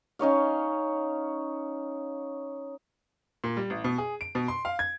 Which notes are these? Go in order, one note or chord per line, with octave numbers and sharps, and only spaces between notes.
C#4 D#4 C#5 F5
A#2
G3
A1
B2
G#4
D7
B2
C6
F5
G#6